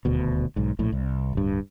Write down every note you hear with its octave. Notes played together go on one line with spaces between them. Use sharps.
D#1 D2 B2
B1 G#2
A#1 A2
C2
D1 G2